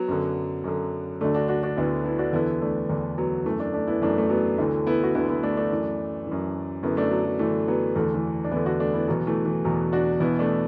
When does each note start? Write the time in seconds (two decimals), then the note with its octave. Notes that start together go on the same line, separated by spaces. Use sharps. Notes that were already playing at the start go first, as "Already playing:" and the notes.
Already playing: F#3 B3
0.08 F#2 D3
0.64 F#2 D3
1.21 D2 D3 A3 D4
1.35 D4 F#4
1.48 D4 F#4
1.63 D4 F#4
1.76 D2 D3 B3 E4
2.05 B3 E4
2.19 D4 F#4
2.33 E2 D3 B3 E4
2.62 A3 D4
2.90 E2 D3
3.18 F#3 B3
3.45 F#2 E3 A3
3.59 A3 D4
3.74 A3 D4
3.87 B3 E4
4.01 F#2 E3 A3 D4
4.18 A3
4.30 F#3 B3
4.58 D2 D3 E3 A3
4.87 B3 E4
5.03 F#4
5.15 D2 D3 B3 E4
5.29 B3 E4
5.43 A3 D4
5.57 A3 D4
5.71 F#2 E3
6.27 F#2 E3
6.83 F#2 D3 B3 E4
6.97 A3 D4
7.11 F#3
7.25 F#3
7.39 F#2 D3 E3 A3
7.68 F#3 B3
7.96 E2 D3 E3 A3
8.14 E3 A3
8.44 D4
8.52 E2 D3 B3 E4
8.66 D4 F#4
8.80 A3 D4
8.94 B3 E4
9.08 E2 B2 F#3 B3
9.27 E3 A3
9.45 E3
9.65 E2 B2 F#3
9.92 D4 F#4
10.20 E2 B2 B3 E4
10.39 A3 D4